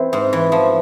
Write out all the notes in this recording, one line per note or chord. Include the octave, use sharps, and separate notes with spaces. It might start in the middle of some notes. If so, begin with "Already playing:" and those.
Already playing: E3 C4
G#2
E3
F3